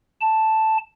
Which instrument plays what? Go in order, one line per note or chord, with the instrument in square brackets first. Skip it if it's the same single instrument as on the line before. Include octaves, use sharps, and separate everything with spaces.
[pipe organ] A5